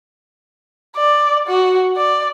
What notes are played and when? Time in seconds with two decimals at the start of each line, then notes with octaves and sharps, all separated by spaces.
0.97 D5
1.48 F#4
1.97 D5